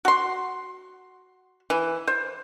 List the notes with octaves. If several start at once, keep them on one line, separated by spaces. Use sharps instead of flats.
F#4 C6
E3
C5